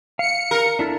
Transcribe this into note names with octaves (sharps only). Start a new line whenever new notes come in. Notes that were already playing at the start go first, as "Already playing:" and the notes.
F5 C#7
A#4
D4 E4 A4